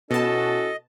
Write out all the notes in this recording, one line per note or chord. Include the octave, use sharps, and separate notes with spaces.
B2 C#4 E4 F#4 A4 D#5 A5